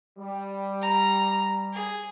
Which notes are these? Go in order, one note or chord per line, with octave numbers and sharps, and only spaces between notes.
G3
A#5
G#4